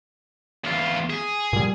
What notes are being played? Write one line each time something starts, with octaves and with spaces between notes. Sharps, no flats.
E2 F4
G#4
A#2 G3